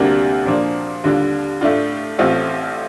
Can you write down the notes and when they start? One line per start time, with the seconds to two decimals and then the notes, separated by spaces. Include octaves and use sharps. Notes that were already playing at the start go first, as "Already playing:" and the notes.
Already playing: D2 C3 G3 A#3 D4
0.45 A#2 F3 A#3 D4
1.04 D#2 D3 G3 D4 F4
1.61 A2 A3 D4 F4
2.19 A1 A2 A3 C4 F4